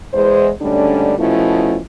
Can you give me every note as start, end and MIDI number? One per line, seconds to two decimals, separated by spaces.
0.14 0.50 40
0.14 0.50 56
0.14 0.50 72
0.60 1.14 44
0.60 1.14 50
0.60 1.14 55
0.60 1.14 57
0.60 1.14 61
0.60 1.14 62
1.18 1.78 47
1.18 1.78 53
1.18 1.78 57
1.18 1.78 61
1.18 1.78 64